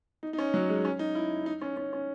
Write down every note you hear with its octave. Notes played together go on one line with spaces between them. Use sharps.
D#4
D#4
C#4
F#3
G#3
C#4
D#4
E4
D#4
C#4
C#4
C#4